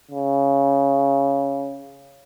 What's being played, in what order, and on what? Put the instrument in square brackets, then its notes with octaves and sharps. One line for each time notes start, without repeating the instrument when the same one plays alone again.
[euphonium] C#3